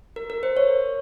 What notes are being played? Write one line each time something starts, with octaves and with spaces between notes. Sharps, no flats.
A#4
A#4
C5
C#5